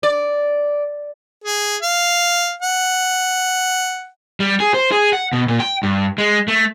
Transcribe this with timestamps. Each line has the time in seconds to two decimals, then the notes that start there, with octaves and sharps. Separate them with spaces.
0.03 D5
1.44 G#4
1.82 F5
2.62 F#5
4.40 G3
4.60 G#4
4.74 C5
4.92 G#4
5.13 F#5
5.33 B2
5.48 A#2
5.60 G5
5.83 G2
6.18 G#3
6.48 A3